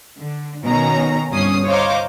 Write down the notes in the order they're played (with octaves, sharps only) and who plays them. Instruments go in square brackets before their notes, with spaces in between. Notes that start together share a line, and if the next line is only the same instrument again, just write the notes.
[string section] D3
B2 D#3 C#4 A#5
G1 C2 G2 C#4 D#6 C7
C5 C#5 D#5 F5 A#5 D6